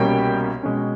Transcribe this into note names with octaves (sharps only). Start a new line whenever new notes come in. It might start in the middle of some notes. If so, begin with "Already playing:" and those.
Already playing: C2 B2 G3 A#3 C#4 G4 G5
B2 G#3 C#4